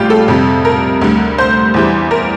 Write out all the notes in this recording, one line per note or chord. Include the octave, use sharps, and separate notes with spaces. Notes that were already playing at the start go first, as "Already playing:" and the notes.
Already playing: A#1 A2 G3 F4 G4
A4
F2 C3 G3
A#4
D2 D3 G3
C5
E2 E3 G3
A#4